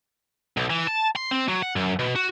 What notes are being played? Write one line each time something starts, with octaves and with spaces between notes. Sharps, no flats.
B1
E3
A5
C6
C4
F#3
F#5
F#2
B2
F#4